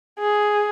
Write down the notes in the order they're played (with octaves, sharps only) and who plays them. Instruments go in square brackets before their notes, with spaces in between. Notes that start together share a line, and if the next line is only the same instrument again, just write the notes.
[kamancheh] G#4